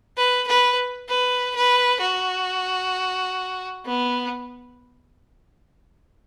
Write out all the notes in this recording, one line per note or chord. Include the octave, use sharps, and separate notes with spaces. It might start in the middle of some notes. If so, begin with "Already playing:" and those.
B4
B4
B4
B4
F#4
B3